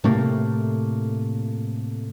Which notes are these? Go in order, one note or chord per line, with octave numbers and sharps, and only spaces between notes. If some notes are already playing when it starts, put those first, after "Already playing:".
A2 C3 A3 A#3